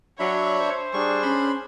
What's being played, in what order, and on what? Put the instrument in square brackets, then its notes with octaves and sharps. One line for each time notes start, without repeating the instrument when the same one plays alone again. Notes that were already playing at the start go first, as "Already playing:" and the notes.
[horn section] F#3 [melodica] D4 E5 B5 [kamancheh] C#5
[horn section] C5
[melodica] G3 C#6 [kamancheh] D4 G#4
[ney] C#4 [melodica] B5 C6